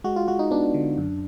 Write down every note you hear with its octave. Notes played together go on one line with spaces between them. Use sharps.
G#3 F#4
F4
G#3 F#4
D#4
B3 D4
D3
F#2